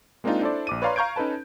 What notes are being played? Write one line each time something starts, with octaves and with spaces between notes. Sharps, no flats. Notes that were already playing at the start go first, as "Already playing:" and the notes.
G#3 A#3 C4 D4 D#4 F4
D4 E4 A4 C5 D5
A#1 D6 D#7
B4 C#5 D5 F5 A#5 C6
F5 A#5 C#6 G6 G#6 D7
C#4 D#4 A4 B4 A5